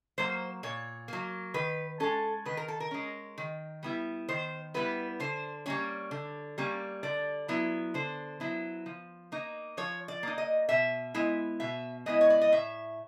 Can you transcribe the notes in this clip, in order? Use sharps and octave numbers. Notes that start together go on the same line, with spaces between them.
F#3 A#3 C5
A#2 C#5
F#3 A#3
D#3 B4
G#3 C#4 A4
D#3 B4
A#4
A4
A#4
G#3 C#4
D#3
G3 B3 E4
D#3 C5
G3 B3 E4 B4
D3 C5
G3 A#3 C#4 C#5
D3
G3 A#3 C#4
D3 D5
F#3 B3 E4
D3 C5
F#3 B3 E4
F3
A#3 D#4
F3 C#5
D5
A#3 D#4
D#5
B2 E5
G#3 B3 E4
B2 E5
G#3 B3 E4 D#5
C#5
D5
D#5
A2 E5